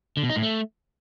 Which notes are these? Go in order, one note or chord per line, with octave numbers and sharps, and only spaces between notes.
D3
B2
D#4
A2
A3